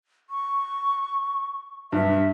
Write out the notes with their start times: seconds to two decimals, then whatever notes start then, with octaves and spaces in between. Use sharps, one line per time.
0.30 C#6
1.92 G2 E5